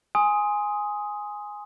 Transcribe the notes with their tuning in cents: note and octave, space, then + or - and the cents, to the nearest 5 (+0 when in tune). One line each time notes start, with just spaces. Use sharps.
G#5 +0 C6 +0 D#6 +10